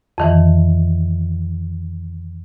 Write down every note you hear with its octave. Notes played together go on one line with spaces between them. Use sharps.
F2 D#3 E3